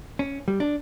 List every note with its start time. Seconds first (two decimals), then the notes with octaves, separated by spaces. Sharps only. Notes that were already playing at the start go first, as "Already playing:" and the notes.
0.19 C#4
0.48 G3
0.60 D4